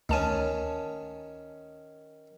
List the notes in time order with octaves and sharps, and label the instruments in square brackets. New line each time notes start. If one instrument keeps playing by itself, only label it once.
[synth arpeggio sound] D2 A5 D#7 [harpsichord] D#3 C#4